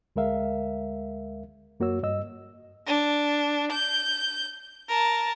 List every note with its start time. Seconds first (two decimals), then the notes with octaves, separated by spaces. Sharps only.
0.16 D2 G#3 A#4 E5 F5
1.80 F#2 A#3 F#4 C#5 E6
2.03 G2 D#5 E6
2.87 D4
3.71 G6
4.89 A#4 A5